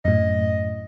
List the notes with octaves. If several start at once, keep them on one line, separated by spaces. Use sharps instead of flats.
F#2 A2 D#5